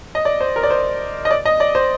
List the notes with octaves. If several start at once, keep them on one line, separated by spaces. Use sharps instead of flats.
D#5
D5
C5
A#4
D5
C5
D#5
D5
D#5
D5
C5